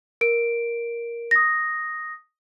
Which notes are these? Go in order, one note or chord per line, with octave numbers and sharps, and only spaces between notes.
A#4 D7
D#6 A#6